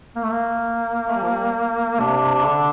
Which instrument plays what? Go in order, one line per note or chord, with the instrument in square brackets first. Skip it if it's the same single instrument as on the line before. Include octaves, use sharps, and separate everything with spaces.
[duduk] A#3
A3
A#3
[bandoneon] A3
G3
F3
G3
[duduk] C3 [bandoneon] D4
[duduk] D3